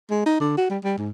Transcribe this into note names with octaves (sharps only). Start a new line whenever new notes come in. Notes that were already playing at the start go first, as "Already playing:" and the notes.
G#3
D#4
D3
F#4
G3
G3
G#2